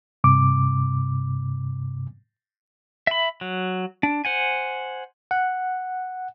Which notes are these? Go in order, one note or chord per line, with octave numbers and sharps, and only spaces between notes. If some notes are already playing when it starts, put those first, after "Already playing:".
G2 C3 D6
E5 B5
F#3
D4
C5 F#5 G#5
F#5